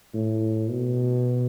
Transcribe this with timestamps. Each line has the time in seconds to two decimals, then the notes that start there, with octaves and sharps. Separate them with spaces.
0.14 A2
0.70 B2